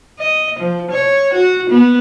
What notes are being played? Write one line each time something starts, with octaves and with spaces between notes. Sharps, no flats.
D#5
F3
C#5
F#4
B3